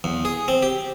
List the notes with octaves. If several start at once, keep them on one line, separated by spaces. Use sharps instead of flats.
E2
G#4
C4
G4